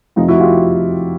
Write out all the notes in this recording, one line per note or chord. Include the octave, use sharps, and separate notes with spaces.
F2 C3 F3 A3 C4 D#4 F4
E4 F#4
F4 G4